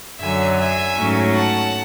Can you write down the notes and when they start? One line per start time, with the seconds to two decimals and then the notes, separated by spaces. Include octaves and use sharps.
0.22 F#2 D3 F#3 E5 G#5
0.59 E5 G#5
0.96 G#2 F#3 A3 C#4
1.34 F#5 A5